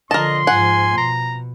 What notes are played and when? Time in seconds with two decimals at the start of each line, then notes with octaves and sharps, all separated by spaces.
0.11 D3 F3 A#4 D#5 A5 C6
0.47 G#2 F3 F#5 G#5
0.98 B2 A#5